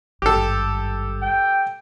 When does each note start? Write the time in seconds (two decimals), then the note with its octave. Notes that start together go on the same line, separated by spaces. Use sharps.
0.22 G#1 G2 G4 A4
1.22 G5